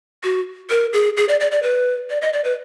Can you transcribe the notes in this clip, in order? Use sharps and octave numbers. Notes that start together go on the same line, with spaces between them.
F#4
A#4
G#4
G#4
D5
D5
D5
B4
D5
D#5
D5
B4